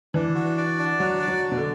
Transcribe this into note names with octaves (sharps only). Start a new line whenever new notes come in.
E3 D4
F#4
D5
D4
F#3 F#4
D5
F#3
D4
B2
D3